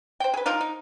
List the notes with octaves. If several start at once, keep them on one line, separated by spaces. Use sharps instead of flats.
C5 G5
G#4 B4
F3 D#4 F4 A#4
D#4